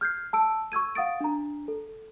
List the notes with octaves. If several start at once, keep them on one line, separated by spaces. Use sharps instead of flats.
F6 G6 G#6 C7
A5 E6 D7
C#6 E6 G#6 D#7
F5 F#5 D#6 A6 D7
D4 A#5
A4